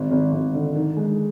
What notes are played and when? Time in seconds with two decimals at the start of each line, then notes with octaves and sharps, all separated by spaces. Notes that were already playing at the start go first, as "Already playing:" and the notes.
Already playing: G#1
0.11 G#1
0.32 G#1
0.54 D3
0.75 D#3
0.97 G#3